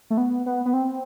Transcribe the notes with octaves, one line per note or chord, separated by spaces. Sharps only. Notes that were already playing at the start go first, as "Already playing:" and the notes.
A3
B3
B3
B3
C4